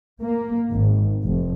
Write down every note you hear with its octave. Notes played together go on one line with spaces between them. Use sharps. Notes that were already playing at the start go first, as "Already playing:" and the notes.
A#3
G#1
F1